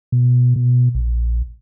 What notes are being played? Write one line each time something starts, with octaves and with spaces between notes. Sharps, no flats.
B2
B2
A#1